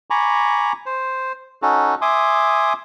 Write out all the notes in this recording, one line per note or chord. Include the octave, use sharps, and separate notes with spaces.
G#5 A#5 B5 C#6 D6
C5
C#4 D#4 F#4 A4
E5 G#5 C6 D6 D#6